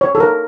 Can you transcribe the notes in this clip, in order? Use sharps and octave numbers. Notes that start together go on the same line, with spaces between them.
C#5
A4
A#4